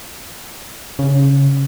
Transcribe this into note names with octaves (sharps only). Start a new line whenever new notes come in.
C#3